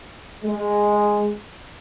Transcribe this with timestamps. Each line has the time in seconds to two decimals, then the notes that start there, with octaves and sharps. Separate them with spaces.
0.45 G#3